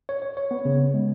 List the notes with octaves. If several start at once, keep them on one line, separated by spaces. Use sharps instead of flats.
C#5
C#5
C#5
B3
C#3
B3
G#3